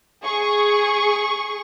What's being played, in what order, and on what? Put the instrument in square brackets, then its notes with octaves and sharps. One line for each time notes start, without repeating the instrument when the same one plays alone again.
[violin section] G#4 C#6